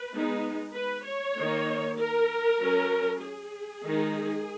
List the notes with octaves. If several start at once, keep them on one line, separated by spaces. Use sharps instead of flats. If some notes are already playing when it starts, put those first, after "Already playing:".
Already playing: B4
G#3 B3 D#4
B4
C#5
D#3 A#3 D#4
A#4
F#3 C#4
G#4
D#3 G#3 D#4